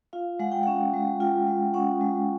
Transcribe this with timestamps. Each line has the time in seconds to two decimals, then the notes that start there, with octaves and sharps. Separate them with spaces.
0.13 F4 F5
0.39 G#3 F#5
0.52 G5
0.63 C#4 F#5
0.94 G#3
1.20 F4 G5
1.47 G#3
1.74 C#4 F#5
2.01 G#3